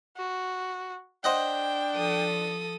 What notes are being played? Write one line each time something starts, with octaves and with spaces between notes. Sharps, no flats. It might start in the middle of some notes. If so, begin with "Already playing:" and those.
F#4
D4 C5 D#5 F#5 G5
F3 A4 D#6